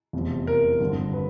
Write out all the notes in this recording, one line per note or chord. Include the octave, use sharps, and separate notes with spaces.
F1 E2 C3 F3
A#4
G#1 G2 D3 F3
B4